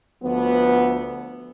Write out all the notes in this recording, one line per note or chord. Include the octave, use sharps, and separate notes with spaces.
D2 F3 B3